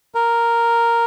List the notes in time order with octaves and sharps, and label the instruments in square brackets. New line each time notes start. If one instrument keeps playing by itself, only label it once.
[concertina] A#4